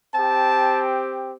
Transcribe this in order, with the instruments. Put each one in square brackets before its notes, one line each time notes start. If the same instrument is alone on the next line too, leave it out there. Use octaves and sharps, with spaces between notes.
[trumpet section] C4 G4 A5